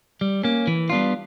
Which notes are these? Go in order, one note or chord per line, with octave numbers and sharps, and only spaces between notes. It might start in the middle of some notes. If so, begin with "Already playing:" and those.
G3
A#3 C#4
E3
G3 B3 D4 F4